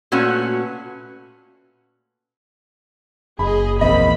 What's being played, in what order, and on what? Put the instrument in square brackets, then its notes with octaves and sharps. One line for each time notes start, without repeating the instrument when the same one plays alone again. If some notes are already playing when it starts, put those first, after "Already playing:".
[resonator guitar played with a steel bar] A#2 A3 C#4 F#4 B4
[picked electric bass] F#1 [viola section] G#4 D#5 [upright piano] B5
[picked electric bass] A#1 E2 [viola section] A#3 C4 B5 [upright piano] D#5